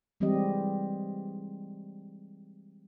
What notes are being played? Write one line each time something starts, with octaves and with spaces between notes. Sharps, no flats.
E3 G3 G#3 C4 G4 D#5